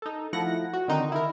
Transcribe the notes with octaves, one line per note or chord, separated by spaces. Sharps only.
D#4 A4
F3 A3 E4 F#5 A#6
F#4
D3 D#3 C4 D#4
E4 A#4